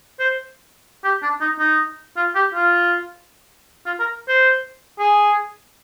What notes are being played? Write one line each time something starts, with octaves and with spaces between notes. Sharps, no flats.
C5
G4
D4
D#4
D#4
F4
G4
F4
F4
A#4
C5
G#4